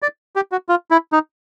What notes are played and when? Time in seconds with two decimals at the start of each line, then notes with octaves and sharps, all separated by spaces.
0.02 D5
0.36 G4
0.52 F#4
0.69 F4
0.91 E4
1.12 D#4